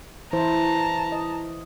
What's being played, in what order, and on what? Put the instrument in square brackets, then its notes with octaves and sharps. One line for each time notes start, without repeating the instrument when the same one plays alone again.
[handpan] E3 E4 C5 [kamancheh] A5 A#5
[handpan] D#5